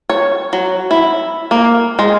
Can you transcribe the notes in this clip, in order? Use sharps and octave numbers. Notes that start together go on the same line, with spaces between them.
C#5
F#3
E4
A#3
G#3